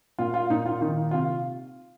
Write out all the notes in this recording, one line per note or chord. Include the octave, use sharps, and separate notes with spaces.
A#2 F4
F4
A#2 D#4
F4
D#3 D#4
C3 F4